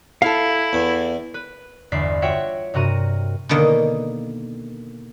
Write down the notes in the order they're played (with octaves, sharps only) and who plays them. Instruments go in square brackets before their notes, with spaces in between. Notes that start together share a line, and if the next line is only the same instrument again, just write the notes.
[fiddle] E4 [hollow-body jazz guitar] A4 F5
[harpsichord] E2
[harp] B4
G1 E2 D5 B6 C7
F4 F#4 C#5 E5 F#5 G5
G2 C3 F#4 A#4 D#7
[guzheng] B2 D3 D#3 A#3